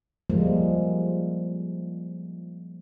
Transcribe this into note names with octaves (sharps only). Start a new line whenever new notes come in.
F3 G3 G#3 A#3